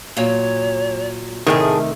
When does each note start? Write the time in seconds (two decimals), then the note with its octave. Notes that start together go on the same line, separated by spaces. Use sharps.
0.17 A#2 F#3 C#5
1.47 A2 C3 D#3 A3 G#4 A#4